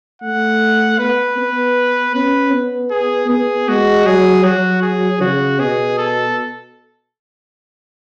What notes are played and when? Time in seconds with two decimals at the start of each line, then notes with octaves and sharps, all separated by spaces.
0.22 A3 F#5
0.99 B3 B4
1.38 B3
2.14 C#4 B4
2.53 B3
2.91 G#4
3.29 B3 G#4
3.68 G#3 F#4
4.06 F#3 G#4
4.44 F#3 F#4
4.83 G#4
5.21 C#3 F#4
5.60 B2 G#4
5.98 A4